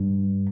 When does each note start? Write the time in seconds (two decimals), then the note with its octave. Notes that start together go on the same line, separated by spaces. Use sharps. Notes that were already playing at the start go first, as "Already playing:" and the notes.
Already playing: G2